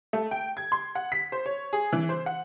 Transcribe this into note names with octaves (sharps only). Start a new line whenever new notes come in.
A3
G5
G#6
C6
F#5
B6
C5
C#5
G#4
E3
C5
F#5